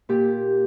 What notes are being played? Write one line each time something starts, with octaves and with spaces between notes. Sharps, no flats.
A#2 G4